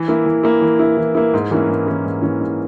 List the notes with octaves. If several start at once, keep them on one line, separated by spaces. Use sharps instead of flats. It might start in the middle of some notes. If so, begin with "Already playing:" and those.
Already playing: E3
A#3 E4
E3
A#3 E4
E3
A#3 E4
E3
A#3 E4
G#2
E3 A#3 C#4 E4
G#2
E3 A#3 C#4 E4
G#2
E3 A#3 C#4 E4
G#2